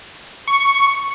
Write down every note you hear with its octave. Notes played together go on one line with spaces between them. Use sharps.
C#6